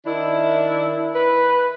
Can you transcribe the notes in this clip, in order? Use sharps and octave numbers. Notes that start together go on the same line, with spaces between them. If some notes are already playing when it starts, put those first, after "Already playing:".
D#3 D4 E4
B4